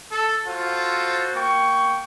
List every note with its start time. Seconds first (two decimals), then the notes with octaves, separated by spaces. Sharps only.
0.12 A4
0.48 F4 F#4 A4 C5
1.36 A#3 G5 C#6